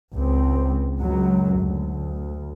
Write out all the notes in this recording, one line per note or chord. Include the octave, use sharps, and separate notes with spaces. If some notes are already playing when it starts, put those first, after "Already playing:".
C#2 C4
C#2 F#2 F#3
D2